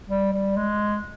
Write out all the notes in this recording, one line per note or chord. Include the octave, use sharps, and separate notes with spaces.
G3
G3
G#3